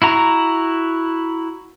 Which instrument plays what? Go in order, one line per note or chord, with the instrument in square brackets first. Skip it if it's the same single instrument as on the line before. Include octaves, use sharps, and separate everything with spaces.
[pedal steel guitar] E4 F#4 A#5